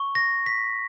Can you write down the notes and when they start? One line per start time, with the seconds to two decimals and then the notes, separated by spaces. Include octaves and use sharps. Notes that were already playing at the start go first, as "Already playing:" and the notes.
Already playing: C#6
0.15 A#6
0.46 B6